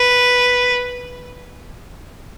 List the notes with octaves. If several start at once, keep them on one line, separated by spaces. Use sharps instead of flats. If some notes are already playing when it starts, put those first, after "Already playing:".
Already playing: B4